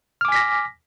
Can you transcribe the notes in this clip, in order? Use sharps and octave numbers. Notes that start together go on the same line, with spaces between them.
G#5 D6 F6 A#6 B6